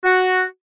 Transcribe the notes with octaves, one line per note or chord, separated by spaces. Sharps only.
F#4